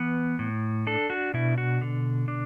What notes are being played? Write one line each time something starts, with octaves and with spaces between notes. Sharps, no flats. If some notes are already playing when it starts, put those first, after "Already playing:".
Already playing: E3 B3
A2
D4 A4
F#4
B2 E4
F#4
D3
D4